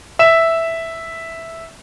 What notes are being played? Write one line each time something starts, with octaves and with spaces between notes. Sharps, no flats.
E5 E7